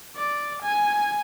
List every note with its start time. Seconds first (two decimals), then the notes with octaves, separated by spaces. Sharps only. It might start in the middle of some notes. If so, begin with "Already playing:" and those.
0.17 D5
0.62 G#5